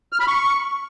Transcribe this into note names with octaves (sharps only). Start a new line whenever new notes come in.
F6
B5
C#6